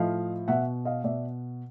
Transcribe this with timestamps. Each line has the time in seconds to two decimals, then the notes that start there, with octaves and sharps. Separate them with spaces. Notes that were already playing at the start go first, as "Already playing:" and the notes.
Already playing: A2 F3 D#5 F5
0.48 B2 E5 F#5
0.85 D#5 F5
1.04 B2 D5 E5